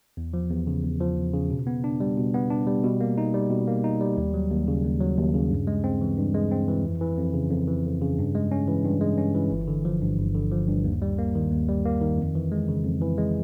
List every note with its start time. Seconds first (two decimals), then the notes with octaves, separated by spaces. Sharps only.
0.17 E2
0.34 F3
0.50 E2
0.67 C#3
0.84 E2
1.01 F3
1.17 E2
1.33 C#3
1.50 B2
1.67 B3
1.84 D4
2.00 G3
2.17 B2
2.34 B3
2.50 D4
2.67 G3
2.84 B2
3.01 A#3
3.18 D#4
3.34 G3
3.50 B2
3.68 A#3
3.84 D#4
4.01 G3
4.17 D#2
4.34 F#3
4.51 D#2
4.68 C#3
4.84 D#2
5.00 F#3
5.18 D#2
5.34 C#3
5.51 G2
5.67 G#3
5.84 C4
6.01 E3
6.18 G2
6.34 G#3
6.51 C4
6.68 E3
6.84 F2
7.01 E3
7.18 F2
7.34 C#3
7.51 F2
7.68 E3
7.84 F2
8.01 C#3
8.18 G2
8.35 G#3
8.52 C#4
8.68 E3
8.84 G2
9.01 G#3
9.18 C#4
9.34 E3
9.51 G1
9.68 D3
9.85 F3
10.01 G2
10.18 G1
10.35 D3
10.51 F3
10.68 G2
10.84 D#2
11.02 G3
11.18 A#3
11.35 D#3
11.51 D#2
11.68 G3
11.85 A#3
12.01 D#3
12.18 F2
12.35 E3
12.52 G#3
12.68 C#3
12.85 F2
13.02 E3
13.18 G#3